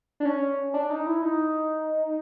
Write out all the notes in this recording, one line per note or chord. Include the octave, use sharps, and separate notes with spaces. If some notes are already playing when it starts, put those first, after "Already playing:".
D4
C#4
D4
D#4
E4
D#4